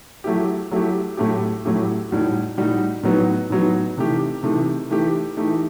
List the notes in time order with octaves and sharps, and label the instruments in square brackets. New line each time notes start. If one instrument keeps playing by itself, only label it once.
[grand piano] F#3 A3 E4 G4
F#3 A3 E4 G4
A2 F#3 A3 E4 G4
A2 F#3 A3 E4 G4
A2 G3 D#4 F#4
A2 G3 D#4 F#4
A2 F#3 B3 D#4
A2 F#3 B3 D#4
C3 E3 A3 D#4 G4
C3 E3 A3 D#4 G4
E3 A3 D#4 G4
E3 A3 D#4 G4